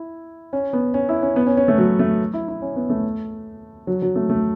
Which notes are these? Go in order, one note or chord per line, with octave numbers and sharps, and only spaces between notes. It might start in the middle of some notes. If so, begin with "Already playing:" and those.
Already playing: E4
C#4
B3
C#4
E4
C#4
B3
C#4
C#4
A3
F#3
A3
E4
E4
C#4
B3
A3
F#3
F#3
A3
A3